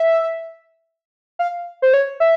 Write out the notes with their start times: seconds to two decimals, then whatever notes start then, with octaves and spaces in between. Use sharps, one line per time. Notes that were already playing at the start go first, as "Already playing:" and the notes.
Already playing: E5
1.39 F5
1.82 C5
1.94 C#5
2.20 E5